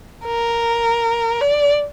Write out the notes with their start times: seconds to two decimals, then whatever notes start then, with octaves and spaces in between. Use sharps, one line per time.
0.25 A#4
1.41 D5